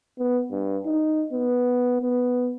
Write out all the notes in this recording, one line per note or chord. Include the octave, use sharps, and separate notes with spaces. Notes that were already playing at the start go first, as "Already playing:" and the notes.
B3
G2
D#4
B3
B3